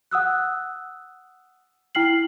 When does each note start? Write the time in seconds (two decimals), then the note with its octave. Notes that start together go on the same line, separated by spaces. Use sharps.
0.11 F#5 D#6 E6 F#6
1.95 E4 G5 F6 C7 F#7